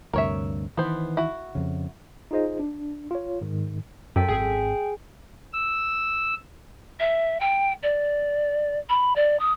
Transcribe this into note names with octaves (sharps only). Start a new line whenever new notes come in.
D2 G2 C3 A#4 C#5 E5
D#3 E3 B3 C5
E4 F#4
F2 C#3
D#4 F4 G#4 C5 D#5
D4
F4 C#5
G#2 D#3
F#2 C3 A4 G5 B6
G#1 B2 C4 G#4 G5
E6
E5
G5
D5
B5
D5
D#6